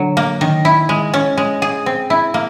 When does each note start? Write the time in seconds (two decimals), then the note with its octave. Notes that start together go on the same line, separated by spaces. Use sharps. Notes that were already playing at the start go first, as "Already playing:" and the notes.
Already playing: D3 F#3
0.17 A#3
0.41 D#3
0.65 E4
0.89 G#3
1.14 C#4
1.37 G#3
1.62 G#4
1.86 C4
2.10 E4
2.34 A#3